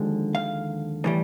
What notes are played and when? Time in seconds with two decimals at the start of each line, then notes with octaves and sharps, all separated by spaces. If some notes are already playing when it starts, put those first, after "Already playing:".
Already playing: D#2 D3 F3 G#3
0.35 F5
1.04 A2 E3 G3